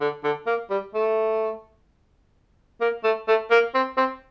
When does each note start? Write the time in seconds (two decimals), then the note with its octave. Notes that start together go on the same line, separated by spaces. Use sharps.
0.01 D3
0.24 D3
0.47 A#3
0.70 G3
0.94 A3
2.81 A#3
3.04 A3
3.28 A3
3.51 A#3
3.75 C4
3.97 C4